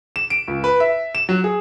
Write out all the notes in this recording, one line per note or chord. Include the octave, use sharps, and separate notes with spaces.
E7
D7
C#2
B4
E5
E7
F#3
G#4